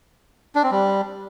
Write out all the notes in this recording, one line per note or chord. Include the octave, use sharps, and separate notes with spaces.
D4
C4
G3